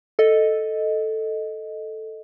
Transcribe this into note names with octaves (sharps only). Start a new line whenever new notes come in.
A4 D#5